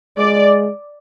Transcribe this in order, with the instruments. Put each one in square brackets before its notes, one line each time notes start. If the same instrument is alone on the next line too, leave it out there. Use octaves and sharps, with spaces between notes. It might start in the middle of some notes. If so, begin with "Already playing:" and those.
[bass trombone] G#3 [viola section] D5